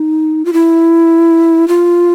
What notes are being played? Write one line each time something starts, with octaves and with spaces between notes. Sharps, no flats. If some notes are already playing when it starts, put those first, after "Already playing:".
Already playing: D#4
F4
E4
F4